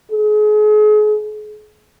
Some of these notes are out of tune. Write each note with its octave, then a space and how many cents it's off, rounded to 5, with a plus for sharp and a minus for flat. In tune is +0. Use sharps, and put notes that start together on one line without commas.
G#4 +35